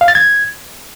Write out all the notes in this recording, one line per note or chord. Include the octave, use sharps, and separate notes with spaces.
F5
A6
G#6